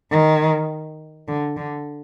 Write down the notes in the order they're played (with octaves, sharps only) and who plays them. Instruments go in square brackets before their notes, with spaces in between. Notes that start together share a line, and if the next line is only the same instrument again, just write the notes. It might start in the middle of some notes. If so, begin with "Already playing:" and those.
[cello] D#3
D3
D3